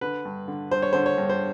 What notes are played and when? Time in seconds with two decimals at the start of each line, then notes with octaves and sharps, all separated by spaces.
0.01 D3 B4
0.25 G2
0.48 D3
0.71 G2 C5
0.82 C#5
0.93 D3 C5
1.06 C#5
1.18 G2
1.29 C5